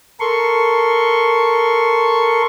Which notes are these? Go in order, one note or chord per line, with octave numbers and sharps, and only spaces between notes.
A4 A#4 C6 C#6